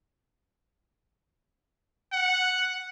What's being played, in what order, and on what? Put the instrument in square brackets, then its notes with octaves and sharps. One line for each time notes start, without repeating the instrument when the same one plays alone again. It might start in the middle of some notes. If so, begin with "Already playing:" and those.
[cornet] F#5